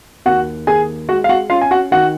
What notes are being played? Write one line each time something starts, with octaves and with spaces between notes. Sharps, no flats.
D#2 F#4 F#5
D#2 G#4 G#5
G#3 F#4 F#5
F5
F#4 F#5
C#4 F4 F5
G#5
F#4 F#5
D#3 F#4 F#5